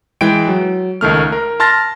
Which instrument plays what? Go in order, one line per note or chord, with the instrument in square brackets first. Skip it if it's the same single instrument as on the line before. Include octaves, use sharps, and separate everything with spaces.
[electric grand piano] E3 G#3 G5 D7
F#3
C#2 D#3 A3 F6
A#4
A5 C6 F6 A6 A#6